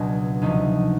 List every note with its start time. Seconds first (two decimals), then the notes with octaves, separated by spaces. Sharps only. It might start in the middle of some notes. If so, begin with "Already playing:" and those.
Already playing: C#2 B2 F#3 D4
0.42 D2 C3 F3 D#4